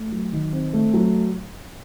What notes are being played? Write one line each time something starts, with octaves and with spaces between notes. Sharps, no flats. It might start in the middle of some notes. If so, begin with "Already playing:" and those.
Already playing: A3
F#3
D#3
C4
A3
F#3